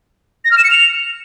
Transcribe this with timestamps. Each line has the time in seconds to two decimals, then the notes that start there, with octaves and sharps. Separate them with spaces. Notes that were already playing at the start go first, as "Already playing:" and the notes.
0.45 A#6
0.51 F6
0.58 E7
0.64 C#7
0.71 F7